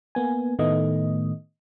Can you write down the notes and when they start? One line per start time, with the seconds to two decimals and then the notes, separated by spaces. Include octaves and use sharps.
0.15 A#3 B3 G#5
0.59 A2 D#3 A3 B3 D#5